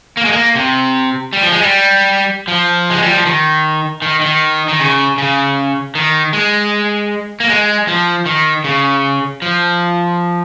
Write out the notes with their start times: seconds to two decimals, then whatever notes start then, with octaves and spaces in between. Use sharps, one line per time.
0.17 A#3
0.25 G#3
0.32 A#3
0.55 C3
1.33 G3
1.43 F3
1.52 G#3
1.62 G3
2.48 F3
2.90 G#3
3.03 G3
3.13 F3
3.26 D#3
4.02 D#3
4.22 D#3
4.68 D#3
4.80 C#3
5.18 C#3
5.95 D#3
6.33 G#3
7.40 A#3
7.49 G#3
7.88 F3
8.26 D#3
8.64 C#3
9.42 F3